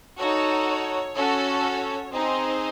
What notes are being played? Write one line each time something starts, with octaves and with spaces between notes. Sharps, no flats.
D#4 F#4 A4 C#5
C#5
C#4 F#4 A4
C#5
C4 D#4 G#4 C5